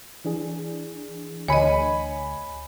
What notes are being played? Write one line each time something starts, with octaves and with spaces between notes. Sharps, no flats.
E3 D4 G#4
D2 C#5 D#5 G#5 B5